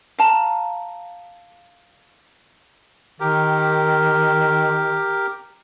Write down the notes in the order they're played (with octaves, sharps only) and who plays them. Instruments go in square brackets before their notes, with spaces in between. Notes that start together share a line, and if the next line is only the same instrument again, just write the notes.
[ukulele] F5 A5 A#5
[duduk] D#3 [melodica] G4 A#4